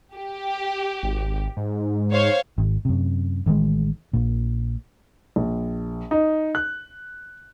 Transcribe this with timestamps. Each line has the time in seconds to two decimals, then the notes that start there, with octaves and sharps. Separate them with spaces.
0.15 G4
1.03 G#1
1.57 G#2
2.11 G#2 C5 C#5 F5
2.58 G#1
2.85 F#2 C3
3.46 A1 D#3 E3 G#3
4.13 A#1 A#2
5.36 A#1
6.11 D#4
6.55 F#6